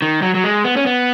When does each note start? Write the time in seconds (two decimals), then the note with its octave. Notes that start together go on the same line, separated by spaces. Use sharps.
0.02 D#3
0.22 F#3
0.34 F#3
0.44 G#3
0.65 B3
0.76 C#4
0.86 B3